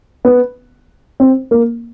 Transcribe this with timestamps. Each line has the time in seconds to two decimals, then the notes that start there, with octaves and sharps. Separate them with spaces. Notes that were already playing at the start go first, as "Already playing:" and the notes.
0.25 B3
1.20 C4
1.51 A#3